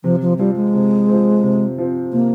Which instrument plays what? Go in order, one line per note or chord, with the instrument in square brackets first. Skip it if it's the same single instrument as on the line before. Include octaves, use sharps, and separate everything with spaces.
[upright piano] C3 [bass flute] F3
[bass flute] F3
[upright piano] F3 C4 [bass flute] G3
[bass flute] G#3
[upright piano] C3
F3 C4
C3
F3 C4
[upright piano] C3 [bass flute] A#3